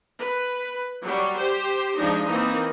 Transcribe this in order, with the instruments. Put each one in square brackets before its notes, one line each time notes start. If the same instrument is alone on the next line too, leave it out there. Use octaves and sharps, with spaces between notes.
[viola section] B4
F#3 G3
G4 C5
F3 G#3 D4 D#4
E3 A#3 C4 D#4